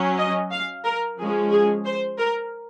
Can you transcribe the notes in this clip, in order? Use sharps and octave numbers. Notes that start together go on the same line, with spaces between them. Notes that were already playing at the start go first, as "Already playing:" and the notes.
Already playing: F#3 C#4
D#5
F5
A#4
F3 G#3 C#4 G#4
G#4
C5
A#4